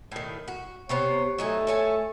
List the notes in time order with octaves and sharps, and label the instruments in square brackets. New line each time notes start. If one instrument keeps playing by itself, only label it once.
[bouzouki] A2 D#3
F#4
[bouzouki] C3 B3 C5 [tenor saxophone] C#5
[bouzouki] F#3 D#4 G#5 [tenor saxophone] A3
[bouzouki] A4 C#5 G#5